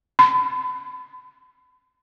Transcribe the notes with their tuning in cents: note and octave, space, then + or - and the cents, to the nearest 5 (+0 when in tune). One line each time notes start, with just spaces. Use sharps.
B5 +30